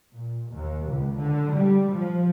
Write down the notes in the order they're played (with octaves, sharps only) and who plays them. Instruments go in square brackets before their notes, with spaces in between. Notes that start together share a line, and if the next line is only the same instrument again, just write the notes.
[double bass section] A#2
D#2
C#2
D3
G3
F3